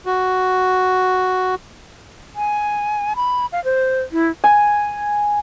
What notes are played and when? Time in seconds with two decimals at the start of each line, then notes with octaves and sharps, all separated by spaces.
0.06 F#4
2.36 G#5
3.16 B5
3.52 F5
3.65 C5
4.12 E4
4.44 G#5